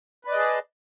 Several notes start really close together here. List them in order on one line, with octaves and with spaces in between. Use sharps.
B4 D5 D#5 G#4 A5